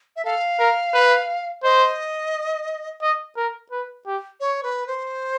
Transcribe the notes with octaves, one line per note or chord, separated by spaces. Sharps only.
E5
A4 F5
A#4
B4
C5 D#5
D#5
A#4
B4
G4
C#5
B4
C5